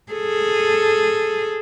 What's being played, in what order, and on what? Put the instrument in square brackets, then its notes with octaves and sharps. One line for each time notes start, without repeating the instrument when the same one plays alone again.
[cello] G#4 A4